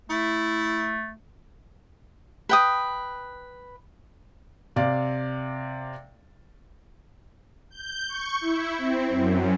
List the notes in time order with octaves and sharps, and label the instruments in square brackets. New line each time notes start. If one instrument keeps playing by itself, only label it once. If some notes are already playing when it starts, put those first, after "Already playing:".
[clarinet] A3 [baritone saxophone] E4
[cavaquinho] B4 G5 D#6
[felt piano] C3 D5 F5
[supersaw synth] G6
C#6
E4
C4
F#2